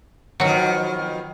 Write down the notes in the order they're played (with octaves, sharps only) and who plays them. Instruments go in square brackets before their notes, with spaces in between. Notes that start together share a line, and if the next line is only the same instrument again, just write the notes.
[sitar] F2 B2 D#3 [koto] F#3 F#4